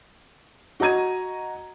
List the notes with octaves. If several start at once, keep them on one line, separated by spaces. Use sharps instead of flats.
F#4 D#5 A#5 G#6 D#7